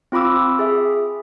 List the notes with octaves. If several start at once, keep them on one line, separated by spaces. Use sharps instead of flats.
C4 F4 B5 D6 E6
G#4 E5